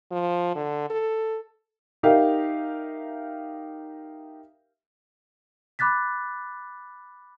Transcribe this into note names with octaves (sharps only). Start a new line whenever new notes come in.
F3
D3
A4
D#4 G4 A#4 E5 F5
B5 D6 F#6 A6 B6